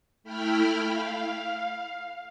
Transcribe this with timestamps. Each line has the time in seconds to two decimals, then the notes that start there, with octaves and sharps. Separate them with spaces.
0.24 A3 E4 G5 B5 F6
0.89 F5